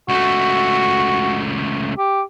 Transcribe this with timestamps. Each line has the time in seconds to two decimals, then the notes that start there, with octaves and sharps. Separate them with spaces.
0.09 C#2 A3 F#4
1.98 G4